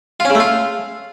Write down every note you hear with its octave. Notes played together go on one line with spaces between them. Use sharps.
F4
C#4
C#3
A3
F4